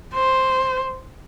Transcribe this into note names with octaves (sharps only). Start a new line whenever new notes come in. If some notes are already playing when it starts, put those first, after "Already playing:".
C5